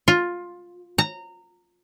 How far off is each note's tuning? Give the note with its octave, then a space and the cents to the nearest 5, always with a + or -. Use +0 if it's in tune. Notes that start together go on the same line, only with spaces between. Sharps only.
F4 +10
A#5 -20